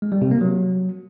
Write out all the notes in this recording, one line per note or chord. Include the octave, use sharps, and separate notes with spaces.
G#3
G3
C3
A#3
F#3